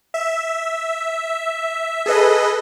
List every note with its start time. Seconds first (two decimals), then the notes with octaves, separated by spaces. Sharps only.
0.14 E5
2.06 G#4 A4 B4 D#5